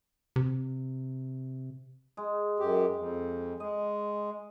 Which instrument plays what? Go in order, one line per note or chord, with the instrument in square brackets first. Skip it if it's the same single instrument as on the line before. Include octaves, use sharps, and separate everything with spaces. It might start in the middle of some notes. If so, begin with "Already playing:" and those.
[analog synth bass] C3
[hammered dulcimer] G#3
[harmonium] F#2 G4
F2
[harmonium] G#3 [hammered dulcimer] D#5